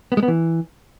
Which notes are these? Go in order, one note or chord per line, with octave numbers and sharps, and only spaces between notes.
B3
G#3
B3
E3